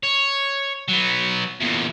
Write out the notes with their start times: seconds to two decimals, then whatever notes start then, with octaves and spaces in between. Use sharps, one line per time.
0.03 C#5
0.88 F#3 B3
1.60 E2 A#2